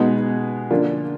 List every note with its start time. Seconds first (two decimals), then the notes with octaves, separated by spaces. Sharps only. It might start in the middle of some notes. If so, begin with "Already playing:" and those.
Already playing: B2 G#3 B3 D#4 G#4
0.71 D3 F3 A#3 D4 F4